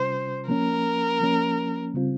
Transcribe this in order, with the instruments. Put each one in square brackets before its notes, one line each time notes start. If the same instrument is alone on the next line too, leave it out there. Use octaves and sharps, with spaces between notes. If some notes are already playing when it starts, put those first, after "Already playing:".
Already playing: [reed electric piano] C3 G3 C#4 F4 [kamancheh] C5
[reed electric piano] F3 A#3 C#4 [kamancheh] A#4
[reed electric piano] F3 A#3 C#4
C#3 G3 C4 F4